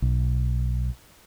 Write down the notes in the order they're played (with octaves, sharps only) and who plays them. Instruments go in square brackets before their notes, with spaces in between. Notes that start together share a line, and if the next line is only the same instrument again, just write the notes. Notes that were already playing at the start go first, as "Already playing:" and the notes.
[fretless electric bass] B1